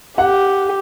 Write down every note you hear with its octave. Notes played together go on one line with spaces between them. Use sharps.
G4 F#5